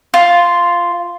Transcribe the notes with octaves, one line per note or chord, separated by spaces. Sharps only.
F4